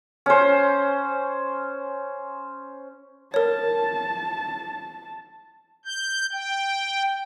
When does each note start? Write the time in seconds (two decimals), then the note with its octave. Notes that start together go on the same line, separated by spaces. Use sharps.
0.26 C#4 C5
3.34 A#4 C#5 A5
5.85 G6
6.33 G5